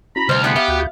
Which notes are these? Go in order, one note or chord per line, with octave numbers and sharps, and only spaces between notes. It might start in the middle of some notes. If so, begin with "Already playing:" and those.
C#4 E4 F#4 A#5 B5
D2 C3 G3 C5 D#5 F6
G#3 B3 E4 G4
G4 E5 F5
D2 F#4 G6